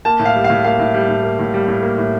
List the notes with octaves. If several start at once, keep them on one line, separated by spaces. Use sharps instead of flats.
A#3 A5
A2
F5
G3
F5
A2
A#3 F5
A2
G3
A2
A#3
A2
G3
A2
A#3
A2